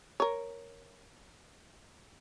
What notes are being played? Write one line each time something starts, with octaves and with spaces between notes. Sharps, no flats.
A#4 C#5